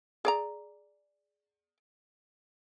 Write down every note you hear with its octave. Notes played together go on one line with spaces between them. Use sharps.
G#4 D5 A#5